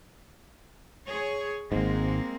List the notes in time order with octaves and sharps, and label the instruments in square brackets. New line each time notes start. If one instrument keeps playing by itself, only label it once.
[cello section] G#4 C#5
[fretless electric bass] G#1 G#2 [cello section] G#3 A#3 C4